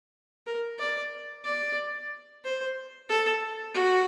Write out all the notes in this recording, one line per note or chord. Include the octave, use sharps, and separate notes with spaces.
A#4
D5
D5
C5
A4
F#4